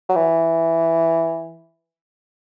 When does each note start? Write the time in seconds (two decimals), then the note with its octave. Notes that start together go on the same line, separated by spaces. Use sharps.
0.09 F#3
0.16 E3